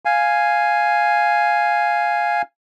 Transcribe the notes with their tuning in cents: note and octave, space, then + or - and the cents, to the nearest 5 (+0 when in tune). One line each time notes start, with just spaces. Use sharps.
F5 +0 G#5 +0